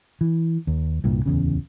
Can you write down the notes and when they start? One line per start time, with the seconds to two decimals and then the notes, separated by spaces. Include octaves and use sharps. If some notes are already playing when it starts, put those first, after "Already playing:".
0.21 E3
0.67 D#2
1.04 C2 G2 A#2
1.26 D1 E2 C#3